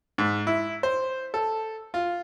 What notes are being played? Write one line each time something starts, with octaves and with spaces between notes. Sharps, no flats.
G#2
E4
C5
A4
F4